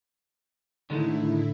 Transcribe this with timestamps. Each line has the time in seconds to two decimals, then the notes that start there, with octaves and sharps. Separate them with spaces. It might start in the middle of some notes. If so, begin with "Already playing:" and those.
0.90 A2 D3 D#3 G#3 A3 E4